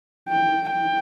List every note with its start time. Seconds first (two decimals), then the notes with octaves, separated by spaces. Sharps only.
0.29 G5
0.71 G5